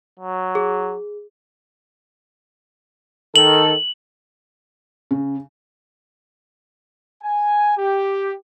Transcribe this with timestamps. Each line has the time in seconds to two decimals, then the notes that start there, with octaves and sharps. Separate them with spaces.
0.19 F#3
0.55 G#4
3.36 D#3 A4 F#7
5.11 C#3
7.23 G#5
7.78 G4